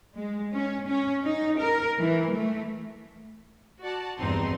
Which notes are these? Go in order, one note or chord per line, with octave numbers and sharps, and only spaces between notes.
G#3
C#4
C#4
D#4
A#4
E3
A3
F#4 D5 F#5 A5
A#1 E2 G2 C4 D#4 C6